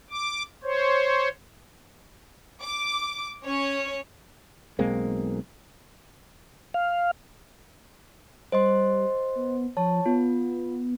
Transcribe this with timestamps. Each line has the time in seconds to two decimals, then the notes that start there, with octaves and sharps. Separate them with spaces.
0.10 D6
0.64 C5 C#5
2.62 D6
3.45 C#4 C#5
4.79 B1 G#3 A#3 C4
6.74 F5
8.52 G3 C5 D#5 C6
9.35 B3
9.77 F3 C#5 A5
10.06 B3 F4